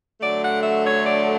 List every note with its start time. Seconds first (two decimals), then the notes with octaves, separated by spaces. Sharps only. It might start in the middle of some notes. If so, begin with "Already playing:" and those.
0.21 D3 F#3 A3 D5
0.42 F#5
0.63 E5
0.85 C#5
1.06 D5